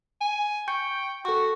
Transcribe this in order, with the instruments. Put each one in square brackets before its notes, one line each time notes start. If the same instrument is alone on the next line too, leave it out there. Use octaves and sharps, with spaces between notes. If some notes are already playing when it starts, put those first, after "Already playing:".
[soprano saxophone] G#5
[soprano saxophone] G5 [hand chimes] C#6 G6 C#7
[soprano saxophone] F#4 [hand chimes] A4 C#6